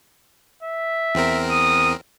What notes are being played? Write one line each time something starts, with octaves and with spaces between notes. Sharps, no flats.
E5
E2 C4 A#4
D#6